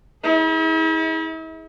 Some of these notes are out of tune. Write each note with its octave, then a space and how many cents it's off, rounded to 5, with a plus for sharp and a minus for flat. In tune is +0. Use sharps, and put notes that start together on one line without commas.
E4 -45 G#4 +0